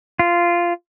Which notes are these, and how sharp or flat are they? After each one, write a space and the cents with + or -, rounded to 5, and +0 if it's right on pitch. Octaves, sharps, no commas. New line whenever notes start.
F4 -10